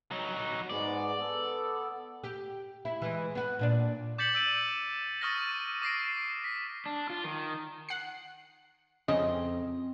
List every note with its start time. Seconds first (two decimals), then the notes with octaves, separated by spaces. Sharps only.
0.11 F#3 D#4
0.70 G#2 G#3 B3 D5
1.19 B3 A4
2.24 G4
2.85 E4
3.02 E3 G#3
3.35 B3 F#4
3.59 A#2 D4 D5
4.18 D6 G6 A6 B6 C#7 F#7
4.35 E6 A6 D7 D#7
5.21 C#6 D#6 F6 A6 A#6
5.82 D6 A#6 C7 D7
6.44 B6
6.86 D4
7.10 F4
7.24 D#3
7.89 F#5 C7
9.08 F2 C#3 C4 D#5